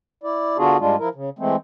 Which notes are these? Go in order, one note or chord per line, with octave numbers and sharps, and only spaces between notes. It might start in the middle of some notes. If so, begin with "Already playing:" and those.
E4 D5
D3 B3 D4 F4 F#4 G#4
G#2 G3 G#3 D4 F4
F3 E4 A#4
C#3
E3 G#3 A3 C4